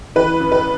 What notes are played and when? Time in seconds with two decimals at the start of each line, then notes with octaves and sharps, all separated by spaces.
0.15 E3 B4
0.40 F#2
0.52 B4